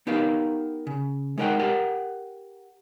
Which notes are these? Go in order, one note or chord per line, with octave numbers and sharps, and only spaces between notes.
B3 D#4 G4 A#4 F5
C#3
G#3 D#4 A#4 D#5 F#5 G5
G4 A#4 F#5 A5